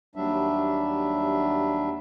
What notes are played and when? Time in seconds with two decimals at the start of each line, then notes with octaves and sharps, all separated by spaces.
0.16 D#2 F#3 G3 D4 E5